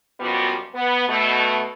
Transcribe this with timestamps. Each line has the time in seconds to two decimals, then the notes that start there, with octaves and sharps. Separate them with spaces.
0.20 F#2 B2 F3 G3 B3 F#4
0.74 B3
1.08 B2 A3